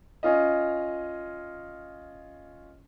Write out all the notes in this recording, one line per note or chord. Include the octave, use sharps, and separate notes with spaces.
C#4 F4 D#5